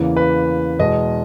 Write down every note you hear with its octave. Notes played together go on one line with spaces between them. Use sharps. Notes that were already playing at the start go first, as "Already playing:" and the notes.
Already playing: E2 C#3 E3 A#3
B4
E2 B2 G#3 D#5